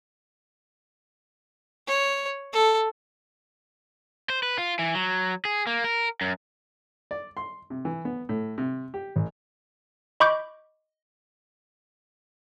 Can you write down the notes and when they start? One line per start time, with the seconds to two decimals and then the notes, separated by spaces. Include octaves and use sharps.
1.87 C#5
2.53 A4
4.30 C5
4.43 B4
4.58 F4
4.79 E3
4.95 F#3
5.45 G#4
5.67 A#3
5.84 A#4
6.21 F#2
7.11 D5
7.37 C6
7.70 C3
7.85 E3
8.05 B3
8.29 A2
8.58 C3
8.94 G4
9.16 A1
10.20 D#5 B5 C#6 D6 G6